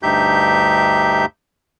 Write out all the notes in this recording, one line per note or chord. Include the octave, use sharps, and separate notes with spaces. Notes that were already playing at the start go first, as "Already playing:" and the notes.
D2 G2 D#4 G4 E5 G6